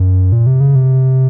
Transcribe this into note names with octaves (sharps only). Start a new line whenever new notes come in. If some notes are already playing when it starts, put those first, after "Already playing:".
Already playing: F#2
A#2
C3
C#3
C3